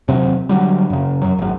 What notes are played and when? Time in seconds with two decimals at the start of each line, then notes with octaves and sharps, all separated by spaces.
0.08 D#2 C3 F#3 C4
0.49 D3 F#3 G3
0.90 F#2 C#3
1.22 F#2 F#3
1.38 G#1 F#2